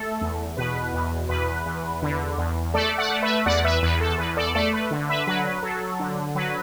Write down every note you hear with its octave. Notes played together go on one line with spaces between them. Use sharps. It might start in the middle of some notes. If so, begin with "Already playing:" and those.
Already playing: A3 A4
E2
B2 B4
E2
E2 B4
E2
D3
E2
A3 A4 D5
D5 F#5
A3
B4 E5
E2 D5 F#5
B4 E5
E2 B4
A4
E2 B4
A4 D5
A3 A4 D5
B4
D3
B4 E5
F#3 B4
B4
F#3 A4
D3
F#3 B4